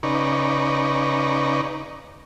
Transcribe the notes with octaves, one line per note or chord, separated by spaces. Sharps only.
C#3 D#4 B4 D5 A#5 C#6